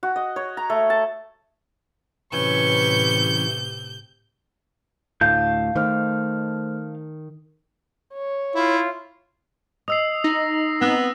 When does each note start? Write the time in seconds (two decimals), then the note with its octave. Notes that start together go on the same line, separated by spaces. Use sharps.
0.03 F#4
0.16 D#5
0.36 C#5
0.57 A#5
0.70 A3
0.90 A5
2.33 A2 C3 E3 F#3 C#4 B4 C#6 G6
5.21 D2 A2 F5 A5 G6
5.75 D#3 A3 C5 F6
8.14 C#5
8.55 E4 F4
9.88 D#5 D#6 E6 C7
10.24 D#4 A#6
10.81 B3 C4 E6 F#6 A#6